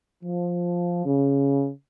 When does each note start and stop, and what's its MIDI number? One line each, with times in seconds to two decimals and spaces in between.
0.23 1.02 53
1.06 1.70 49